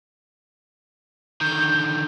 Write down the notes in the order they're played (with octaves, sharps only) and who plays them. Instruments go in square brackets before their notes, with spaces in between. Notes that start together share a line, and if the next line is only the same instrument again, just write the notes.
[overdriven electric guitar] D3 D#3 [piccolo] G6